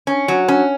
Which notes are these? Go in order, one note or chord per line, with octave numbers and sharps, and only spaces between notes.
C#4
F#3
C#4